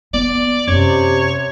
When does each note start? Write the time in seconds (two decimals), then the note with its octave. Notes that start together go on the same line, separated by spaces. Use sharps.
0.13 B3 D5
0.68 F#2 C3 C#5